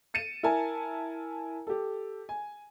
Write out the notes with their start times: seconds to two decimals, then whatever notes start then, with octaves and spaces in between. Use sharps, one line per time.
0.14 A6 C#7 D#7 E7
0.43 E4 A#4 E5 G#5 A5
1.67 G4 A4
2.29 G#5